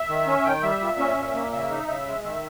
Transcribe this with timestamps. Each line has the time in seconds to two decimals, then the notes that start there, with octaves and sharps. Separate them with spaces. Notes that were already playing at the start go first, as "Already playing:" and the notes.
Already playing: E5
0.09 D#3
0.27 C#4
0.45 D#3 G5
0.63 G3 E5
0.81 A#2
0.99 C#4
1.17 A#2
1.35 A#3
1.52 C#3 E5
1.70 D#4
1.88 C#3 E5
2.06 G#3
2.24 D#3 E5